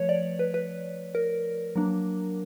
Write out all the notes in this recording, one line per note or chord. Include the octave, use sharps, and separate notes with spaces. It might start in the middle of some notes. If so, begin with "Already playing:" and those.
Already playing: F3 A3 B4 C#5
D5
B4
B4
A#4
F#3 A#3 D4